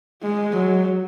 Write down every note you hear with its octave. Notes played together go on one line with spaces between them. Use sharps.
G#3
F#3